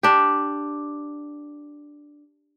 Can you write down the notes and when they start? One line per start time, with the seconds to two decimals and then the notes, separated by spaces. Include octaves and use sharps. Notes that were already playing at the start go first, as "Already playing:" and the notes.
0.03 D4 G4